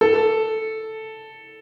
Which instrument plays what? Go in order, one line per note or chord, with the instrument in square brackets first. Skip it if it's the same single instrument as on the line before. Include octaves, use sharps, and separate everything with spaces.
[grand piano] A4